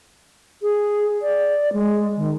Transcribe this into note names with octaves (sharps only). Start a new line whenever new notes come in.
G#4
D5
G#3
D#3